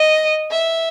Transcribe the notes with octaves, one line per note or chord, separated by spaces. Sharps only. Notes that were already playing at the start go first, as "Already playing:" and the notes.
Already playing: D#5
E5